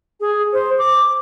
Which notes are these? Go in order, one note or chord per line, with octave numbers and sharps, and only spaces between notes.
G#4
C5
D6